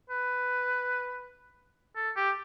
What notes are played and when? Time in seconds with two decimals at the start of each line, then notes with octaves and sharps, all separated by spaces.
0.10 B4
1.96 A4
2.16 G4